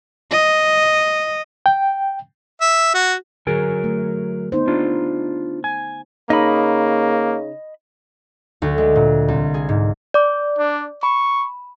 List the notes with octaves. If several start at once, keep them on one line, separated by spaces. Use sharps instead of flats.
D#5
G5
E5
F#4
D3 F#3 G#4 A#4 G#5
A3
B3 D#4 C5
D4 F4
G#5
C#3 A#3 D#4 D#5 B5
D2
G#3
A#2
C2
G#4
G#2
D5 D6
D4
B5 C#6